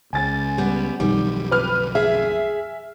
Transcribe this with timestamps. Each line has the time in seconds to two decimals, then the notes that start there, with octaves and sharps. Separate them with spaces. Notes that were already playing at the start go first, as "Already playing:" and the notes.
0.13 C#2 G#5 A6
0.58 G3 B3
1.00 B1 F2 D#3 G3
1.51 B4 F6
1.95 G#4 E5